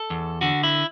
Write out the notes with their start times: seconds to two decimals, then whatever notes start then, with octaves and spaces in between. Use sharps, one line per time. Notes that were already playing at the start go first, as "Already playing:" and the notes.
Already playing: A4
0.10 E2
0.41 D3 F#4
0.63 E4